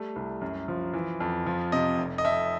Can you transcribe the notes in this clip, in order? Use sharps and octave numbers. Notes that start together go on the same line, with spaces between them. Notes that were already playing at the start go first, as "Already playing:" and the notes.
Already playing: G3 A3
C2
F#2
F3
E3
F2
F3
C3 D#5
F1
D#5
F2 E5